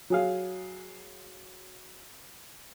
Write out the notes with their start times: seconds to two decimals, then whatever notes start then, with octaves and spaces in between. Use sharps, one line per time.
0.10 F#3 G#4 F5